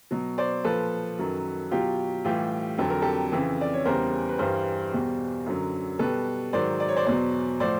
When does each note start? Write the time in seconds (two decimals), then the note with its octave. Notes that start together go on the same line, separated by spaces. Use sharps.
0.11 B2 F#3
0.38 C5 D5
0.64 A#2 F3 A4 B4
1.19 F#2 D#3 F#3
1.71 B2 F#3 F4 G4
2.25 A2 E3 G3 F4 G4
2.78 F2 D3 F#3 A4
2.90 A#4
3.02 G4 A4
3.32 F2 C#3 E3
3.61 D5
3.73 C#5
3.85 E2 C#3 E3 G3 A#4 C5
4.29 B4
4.39 G2 E3 G3 A#4 C5
4.92 E2 B2 G3
5.46 F#2 D3 F#3
5.99 B2 G3 A4 B4
6.53 G#2 D#3 F#3 C5 D5
6.80 D5
6.88 C#5
6.96 C5 D5
7.06 E2 B2 F#3 C5 D5
7.60 A2 F3 C5 D5